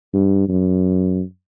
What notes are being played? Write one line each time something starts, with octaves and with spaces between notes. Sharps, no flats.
G2
F#2